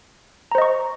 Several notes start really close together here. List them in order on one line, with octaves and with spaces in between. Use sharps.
A#5 C5 D#5 C#6